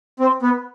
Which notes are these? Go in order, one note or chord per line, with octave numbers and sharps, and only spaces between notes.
C4
B3